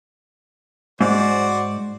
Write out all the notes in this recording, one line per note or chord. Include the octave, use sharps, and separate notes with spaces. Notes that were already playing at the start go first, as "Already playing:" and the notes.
G#2 F#4 C5 D5